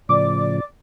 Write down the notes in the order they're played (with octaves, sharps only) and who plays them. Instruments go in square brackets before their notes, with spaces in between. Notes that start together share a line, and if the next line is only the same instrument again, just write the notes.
[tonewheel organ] A2 C#3 F3 [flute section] D5 [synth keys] D6